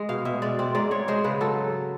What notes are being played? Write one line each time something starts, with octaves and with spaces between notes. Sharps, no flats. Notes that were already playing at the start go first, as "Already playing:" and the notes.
Already playing: G#3
B2 F5
B2 E5
G#3 D5
C4 D5
G#2 D5
G#2 C#5
G#3 C5
C#3 B4
F#3 A4